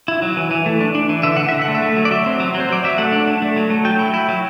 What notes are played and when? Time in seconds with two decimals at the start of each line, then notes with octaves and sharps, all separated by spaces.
0.08 E4
0.22 F#3
0.37 E3
0.51 E3
0.66 A3
0.81 D4
0.95 D4
1.09 E3
1.23 D3 E5
1.37 D3 F#5
1.49 D3 E5
1.62 F#5
1.68 A3
1.75 E5
1.82 A3
1.97 F#3
2.05 D5
2.11 F#3 E5
2.26 C4
2.40 F#3
2.54 F#3
2.60 C5
2.69 F#3 D5
2.84 F#3 E5
2.98 A3 F#5
3.12 D4
3.27 D4
3.42 A3
3.56 F#3
3.70 A3
3.85 F#3 G5
3.99 E4
4.14 E4
4.29 F#3